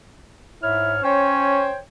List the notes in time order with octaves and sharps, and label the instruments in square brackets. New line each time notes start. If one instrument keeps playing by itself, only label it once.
[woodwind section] G#2 C#5 F6 [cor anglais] E4
[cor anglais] C#4 [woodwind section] C5 C#5 G5